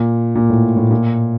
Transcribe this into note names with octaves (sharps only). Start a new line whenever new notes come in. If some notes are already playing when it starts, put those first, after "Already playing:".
Already playing: A#2
A#2
A2
A2
A#2